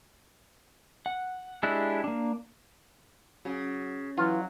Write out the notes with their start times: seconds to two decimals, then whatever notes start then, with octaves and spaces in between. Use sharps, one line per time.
1.06 F#5
1.63 G#3 D4 E4 G4 F#6
2.04 A#3 D4
3.45 C#3 F#3
4.18 E3 F#3 F4